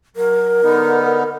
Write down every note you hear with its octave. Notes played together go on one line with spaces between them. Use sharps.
F#3 A#4
D3 B3 D#4